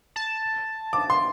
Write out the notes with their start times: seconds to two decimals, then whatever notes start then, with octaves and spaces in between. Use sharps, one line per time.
0.16 A5
0.93 D6
1.10 C6